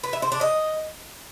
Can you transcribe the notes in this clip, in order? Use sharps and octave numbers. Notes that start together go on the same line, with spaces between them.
B4
E5
C5
D4
D#5